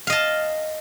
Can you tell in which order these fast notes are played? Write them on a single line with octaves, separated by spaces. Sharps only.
F5 D#5 A5